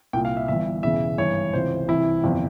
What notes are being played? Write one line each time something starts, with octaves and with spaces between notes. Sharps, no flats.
C2 A#2 G5
F5
E5
G1 G2 E3 E5
E1 E2 C#3 E3 E5
G#1 G2 E3 C#5
C#2 C3 E3 C5
C2 C3 E3 E4
G1 F2 C3 E3